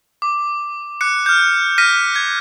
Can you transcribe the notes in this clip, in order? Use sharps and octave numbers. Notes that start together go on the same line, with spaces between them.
D6
D6 F#6 C#7
F6 G6
F6 G6 A#6 B6 D#7
G#6